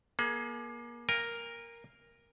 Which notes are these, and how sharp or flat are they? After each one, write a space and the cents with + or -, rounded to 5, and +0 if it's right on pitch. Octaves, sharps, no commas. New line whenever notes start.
A#3 +35 G#4 +40
A#4 +0 F5 +0 G#5 -40